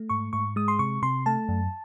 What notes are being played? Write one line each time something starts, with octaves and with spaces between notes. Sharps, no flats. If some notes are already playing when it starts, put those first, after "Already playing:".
Already playing: A3
G#2 C#6
G#2 C#6
G#3 D#6
C6
C3 C#6
C3 C6
A3 A5
F#2